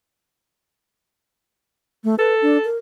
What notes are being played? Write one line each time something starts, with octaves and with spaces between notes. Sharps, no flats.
A3
A4 B4
D4
A#4